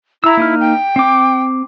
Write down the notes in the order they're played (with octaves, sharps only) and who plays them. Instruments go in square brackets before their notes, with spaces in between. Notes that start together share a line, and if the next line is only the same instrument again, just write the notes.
[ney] E4 [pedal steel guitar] A#5 E6
[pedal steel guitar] A#3 D#4 F6
[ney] G5
[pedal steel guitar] C4 D6